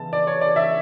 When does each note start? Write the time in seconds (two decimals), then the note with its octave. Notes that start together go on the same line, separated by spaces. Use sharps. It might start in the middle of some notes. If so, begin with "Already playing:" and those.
Already playing: C#3 E3 B3 A5
0.13 D5
0.27 C#5
0.41 D5
0.56 E5